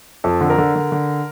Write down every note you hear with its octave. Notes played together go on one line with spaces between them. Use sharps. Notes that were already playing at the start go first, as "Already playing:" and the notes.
F2 A4
D3
A#4
D3
D3
D3